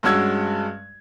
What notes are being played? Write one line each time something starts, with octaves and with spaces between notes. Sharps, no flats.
G2 G#3 C#4 F#4 E6 G#6